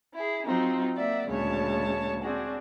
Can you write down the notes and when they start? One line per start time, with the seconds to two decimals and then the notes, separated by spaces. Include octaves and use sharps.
0.14 E4 G#4
0.46 F#3 C4 D#4 F4
0.96 A#3 D5 E5 F#5
1.27 D2 A#2 C#3 G#3 C#5 A5
2.21 C4 D4 F#4 G#4